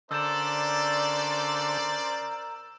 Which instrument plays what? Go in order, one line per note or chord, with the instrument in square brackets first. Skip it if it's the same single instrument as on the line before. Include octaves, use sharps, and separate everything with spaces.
[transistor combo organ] D3 [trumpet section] C#4 C5 D5 [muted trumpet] A#4 [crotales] E6 G6 E7